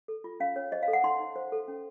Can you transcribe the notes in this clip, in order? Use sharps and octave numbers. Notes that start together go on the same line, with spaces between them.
A4
F4
C#4 F5
C#4 C#5
C5 D#5
F5
A4
F#5
D#4 C6
D#4
C5
A4
C#4